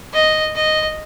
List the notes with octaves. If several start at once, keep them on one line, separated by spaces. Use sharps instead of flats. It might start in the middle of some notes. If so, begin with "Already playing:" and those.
D#5
D#5